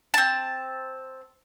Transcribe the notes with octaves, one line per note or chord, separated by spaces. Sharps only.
C4 A5